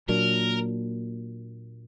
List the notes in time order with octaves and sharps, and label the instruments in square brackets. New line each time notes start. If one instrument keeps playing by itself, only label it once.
[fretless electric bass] A#2 F#3 A#3 D4 [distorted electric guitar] A#4